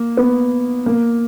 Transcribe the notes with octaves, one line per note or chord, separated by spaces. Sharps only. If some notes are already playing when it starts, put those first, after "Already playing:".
Already playing: A#3
B3
A#3